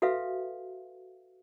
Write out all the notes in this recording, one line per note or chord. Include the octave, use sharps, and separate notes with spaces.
F#4 A4 B4 E5 F5